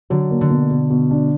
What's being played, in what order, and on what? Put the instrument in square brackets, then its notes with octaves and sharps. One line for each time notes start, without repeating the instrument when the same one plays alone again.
[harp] D3 [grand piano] F#3
[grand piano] A#3
[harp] D3
[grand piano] B2
B2
B2
D4